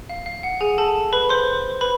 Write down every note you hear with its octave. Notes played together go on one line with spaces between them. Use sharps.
F5
F5
F#5
G#4 G#5
A4 A5
B4 B5
C5 C6
B4 B5